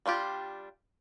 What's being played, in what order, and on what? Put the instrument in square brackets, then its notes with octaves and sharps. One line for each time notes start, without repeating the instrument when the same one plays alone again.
[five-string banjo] G3 D4 F4 G4